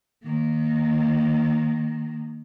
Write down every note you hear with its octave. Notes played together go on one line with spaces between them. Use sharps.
D#3 A#3